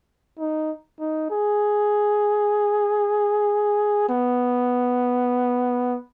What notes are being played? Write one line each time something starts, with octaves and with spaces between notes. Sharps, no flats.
D#4
D#4
G#4
B3